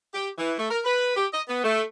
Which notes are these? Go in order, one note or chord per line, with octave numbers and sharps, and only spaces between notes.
G4
E3
A3
A#4
B4
G4
D#5
B3
A3